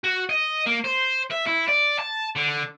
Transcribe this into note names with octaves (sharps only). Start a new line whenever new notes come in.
F#4
D#5
A#3
C5
E5
E4
D5
A5
D3